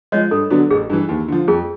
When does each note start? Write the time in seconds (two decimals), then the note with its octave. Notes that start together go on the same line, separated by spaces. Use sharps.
0.12 F3 G#3 C#5 D#5
0.31 G2 A4
0.50 D3 F#3 B3 D4
0.70 A1 G#4
0.90 G2 E3
1.09 D#2
1.28 D3 F3
1.48 F2 G#4